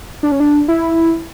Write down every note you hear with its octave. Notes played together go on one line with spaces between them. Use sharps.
D4
C#4
D4
E4